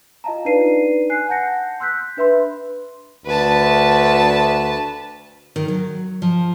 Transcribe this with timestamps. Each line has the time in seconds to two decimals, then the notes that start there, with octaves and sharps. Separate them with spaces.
0.24 F4 D#5 F5 A5 A#5
0.45 D4 D#4 B4 D5 C7 D#7
1.10 G#5 F#6 C7
1.28 F#5 A5 F#6 G6 A#6 C#7
1.80 C6 E6 F#6 G6 B6
2.17 D4 B4 E5 B5 C6
3.26 D2 B4 A5
5.56 D#3
5.68 F#3
6.22 F3